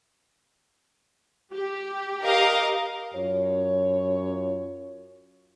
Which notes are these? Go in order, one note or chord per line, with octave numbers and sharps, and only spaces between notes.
G4
A#4 D#5 F5
F#2 F4 C#5